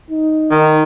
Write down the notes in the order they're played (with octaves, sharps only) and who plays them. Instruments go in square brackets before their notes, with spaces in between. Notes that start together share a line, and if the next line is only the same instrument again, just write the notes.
[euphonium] D#4
[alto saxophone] D#3